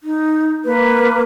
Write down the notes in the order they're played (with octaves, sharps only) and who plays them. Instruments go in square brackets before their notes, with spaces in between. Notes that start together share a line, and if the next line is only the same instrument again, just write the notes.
[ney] D#4
[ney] A#3 [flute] B4